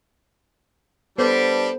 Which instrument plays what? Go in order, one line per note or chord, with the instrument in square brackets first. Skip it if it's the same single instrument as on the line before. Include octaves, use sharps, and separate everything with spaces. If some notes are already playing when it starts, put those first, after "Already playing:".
[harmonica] G3 D4 [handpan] B3 A4 B4 [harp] C5